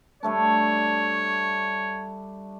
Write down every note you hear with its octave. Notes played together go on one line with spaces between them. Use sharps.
G3 A3 D4 C#5